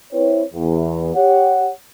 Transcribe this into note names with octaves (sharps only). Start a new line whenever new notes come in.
C4 E4 B4 C#5
E2
G4 C#5 F#5